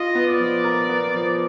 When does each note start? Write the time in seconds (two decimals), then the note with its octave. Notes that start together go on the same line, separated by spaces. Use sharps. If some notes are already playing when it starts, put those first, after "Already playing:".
Already playing: F4 D#5
0.15 B3
0.27 D5
0.40 F3
0.64 A#4
0.89 B3
1.15 F3